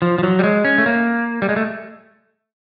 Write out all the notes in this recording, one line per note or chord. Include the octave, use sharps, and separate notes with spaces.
F3
F3
F#3
G3
G#3
C#4
A3
A#3
G3
G#3
A3